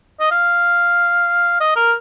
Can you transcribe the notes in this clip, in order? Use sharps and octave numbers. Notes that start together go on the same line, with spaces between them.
D#5
F5
D#5
A#4